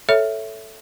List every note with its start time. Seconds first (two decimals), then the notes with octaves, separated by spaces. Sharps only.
0.09 A4 C#5 E5